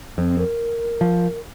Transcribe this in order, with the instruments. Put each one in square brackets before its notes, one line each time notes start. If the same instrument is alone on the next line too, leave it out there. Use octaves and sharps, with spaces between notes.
[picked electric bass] F2 [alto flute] C4
[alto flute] A#4
[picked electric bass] F3